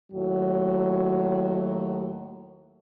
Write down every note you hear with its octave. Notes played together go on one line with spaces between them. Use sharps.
D#2 A2 F#3